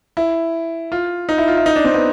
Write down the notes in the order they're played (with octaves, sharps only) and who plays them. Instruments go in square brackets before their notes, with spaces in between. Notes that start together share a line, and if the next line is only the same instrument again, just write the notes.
[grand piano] E4
F4
D#4
E4
F4
E4
D#4
D4
C4
B3